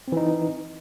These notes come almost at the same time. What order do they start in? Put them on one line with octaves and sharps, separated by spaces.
C4 E3 D#4